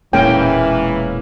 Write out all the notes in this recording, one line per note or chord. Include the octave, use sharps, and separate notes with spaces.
E1 A#2 E3 G#3 A#3 C#4 G5